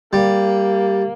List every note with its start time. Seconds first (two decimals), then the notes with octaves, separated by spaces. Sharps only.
0.13 G3 A#3